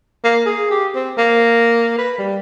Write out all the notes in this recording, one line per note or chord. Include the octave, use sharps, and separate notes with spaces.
A#3
G#4
G4
C4
A#3
B4
G3